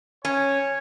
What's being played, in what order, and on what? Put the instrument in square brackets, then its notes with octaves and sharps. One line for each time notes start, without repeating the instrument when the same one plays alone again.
[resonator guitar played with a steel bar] C#4 [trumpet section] C#5 G#5